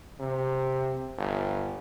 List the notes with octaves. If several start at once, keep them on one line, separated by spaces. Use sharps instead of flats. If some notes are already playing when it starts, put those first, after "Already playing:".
C3
G1